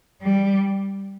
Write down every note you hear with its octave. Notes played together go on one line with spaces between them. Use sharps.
G3